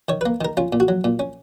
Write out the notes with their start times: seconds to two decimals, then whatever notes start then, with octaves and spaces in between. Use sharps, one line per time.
0.09 D#3 C#5
0.21 A#3 B4
0.41 D#3 A#4
0.57 C#4 F4
0.73 A#2
0.80 F#4
0.88 F#3
1.04 A#2
1.19 C#4